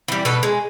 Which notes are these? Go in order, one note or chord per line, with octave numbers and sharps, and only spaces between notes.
E3 G3
B2 A4 B4
G#3